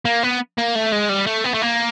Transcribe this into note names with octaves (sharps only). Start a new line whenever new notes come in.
A#3
B3
A#3
A3
G#3
G3
A3
B3
A3
A#3